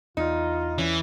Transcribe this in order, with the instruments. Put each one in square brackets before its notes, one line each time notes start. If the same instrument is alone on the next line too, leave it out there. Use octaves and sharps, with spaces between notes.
[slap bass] E2 [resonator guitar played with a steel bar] D#4 [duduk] F4
[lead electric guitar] E3 [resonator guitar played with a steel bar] C#4